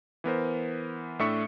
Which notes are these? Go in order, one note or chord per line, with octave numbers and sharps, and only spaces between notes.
E3 B3 A#4 C5
A2 A3 D4 E5 C#6 C#7